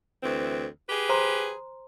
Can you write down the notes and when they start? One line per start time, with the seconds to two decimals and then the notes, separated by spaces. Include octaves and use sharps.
0.23 D2 E3 C4
0.88 G4 G#4 B4
1.09 C5 A#5 C6